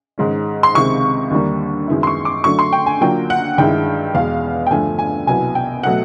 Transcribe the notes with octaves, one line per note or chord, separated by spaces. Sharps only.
G#2 D#3 G#3 C#4
C6
C#2 C3 D#3 G#3 C#6
D#2 D3 G3 A#3
F#2 D#3 G#3 B3 E4
C6
C#6
D6
D3 F#3 A3 D4 C#6
C6
G5
G#5
D3 F#3 A#3 D4 F4 G5
F#5
G2 D#3 G#3 C#4 E4 G5
E2 B2 G#3 F5
G5
G2 D3 F3 A3 G#5
G#5
C2 B2 F#3 B3 E4 G#5
G5
B2 F#3 A3 F#5